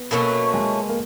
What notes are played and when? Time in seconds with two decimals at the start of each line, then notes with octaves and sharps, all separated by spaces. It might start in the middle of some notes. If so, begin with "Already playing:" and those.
Already playing: B3
0.11 B2 F#3 A3 A#3 C#4
0.54 G#3
0.89 A#3